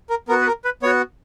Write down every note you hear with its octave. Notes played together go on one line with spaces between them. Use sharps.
A#4
B3 F#4 A#4
B4
A#4
B4
B3 F#4 C#5